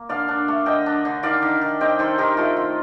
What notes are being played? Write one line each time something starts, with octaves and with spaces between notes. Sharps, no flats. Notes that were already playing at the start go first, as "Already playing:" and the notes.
Already playing: A#3
D3 D5 F5
D4
A3
D3 D#5 G5
D4
D3
D#3 D5 F5
D#3
D#3
C4 D#5 G5
D#3 A4 C5
D#3 G4 A#4
A3 F4 A4
D#3